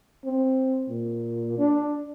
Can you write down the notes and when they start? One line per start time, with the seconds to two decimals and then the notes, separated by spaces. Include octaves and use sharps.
0.25 C4
0.89 A#2
1.58 D4